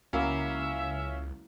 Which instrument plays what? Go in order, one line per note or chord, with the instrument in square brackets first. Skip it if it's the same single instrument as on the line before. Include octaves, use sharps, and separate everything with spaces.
[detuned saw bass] C#2 [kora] F#3 A#3 E4 [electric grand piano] C#4 F5 [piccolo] E5